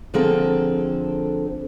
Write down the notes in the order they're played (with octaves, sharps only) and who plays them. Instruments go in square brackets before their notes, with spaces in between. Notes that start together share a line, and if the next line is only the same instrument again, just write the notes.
[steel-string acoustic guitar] D3 F3 A#3 C4 G#4 A4